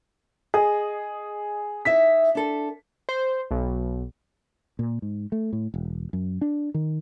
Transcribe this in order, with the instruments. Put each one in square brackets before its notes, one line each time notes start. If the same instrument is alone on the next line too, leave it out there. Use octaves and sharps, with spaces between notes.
[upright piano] G#4 [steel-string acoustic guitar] D#5
[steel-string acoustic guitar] D#4 E4 E5 [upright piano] B6
[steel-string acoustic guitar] D4 A4
[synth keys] C5
B1
[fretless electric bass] A#2
G#2
A3
A2
E1
F#2
D4
D#3